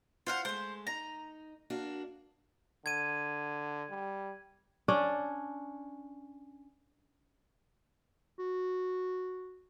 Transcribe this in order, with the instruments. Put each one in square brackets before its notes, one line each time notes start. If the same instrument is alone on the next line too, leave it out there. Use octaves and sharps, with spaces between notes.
[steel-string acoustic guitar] F4 [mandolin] C5 F5 F#5
[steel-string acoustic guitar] G#3 A3 [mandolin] C5
[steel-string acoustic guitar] D#4 [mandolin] A#5
[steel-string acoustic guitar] A#3 D4 F#4
[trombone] D3 [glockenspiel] G#6 D#7
[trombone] G3
[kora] C#4 D4
[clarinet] F#4